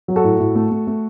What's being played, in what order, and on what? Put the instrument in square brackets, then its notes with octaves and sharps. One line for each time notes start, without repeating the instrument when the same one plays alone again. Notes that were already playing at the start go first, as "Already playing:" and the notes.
[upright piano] F#3
F#4 A4
A2
A2
A3
A3
A3